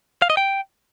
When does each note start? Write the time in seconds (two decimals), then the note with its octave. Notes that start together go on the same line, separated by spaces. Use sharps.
0.22 F5
0.30 D#5
0.37 G5